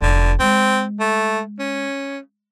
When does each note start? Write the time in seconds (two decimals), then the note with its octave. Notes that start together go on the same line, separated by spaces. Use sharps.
0.02 F1 D3
0.40 G#3 C4
1.00 A3
1.59 C#4